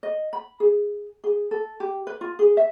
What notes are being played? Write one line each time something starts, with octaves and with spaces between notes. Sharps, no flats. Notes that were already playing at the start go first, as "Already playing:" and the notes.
D#5
B5
G#4
G#4
A4
G4
B4
F4
G#4
E5